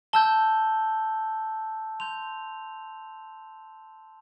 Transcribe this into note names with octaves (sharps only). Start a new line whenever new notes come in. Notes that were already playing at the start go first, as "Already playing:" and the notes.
A5 E6 G6 G7
C6 G6 F7